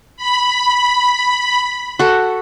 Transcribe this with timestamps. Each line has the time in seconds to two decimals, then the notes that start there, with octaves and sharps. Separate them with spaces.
0.16 B5
1.99 F#4 A4